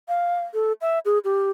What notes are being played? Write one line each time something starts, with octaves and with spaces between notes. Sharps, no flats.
F5
A4
E5
G#4
G4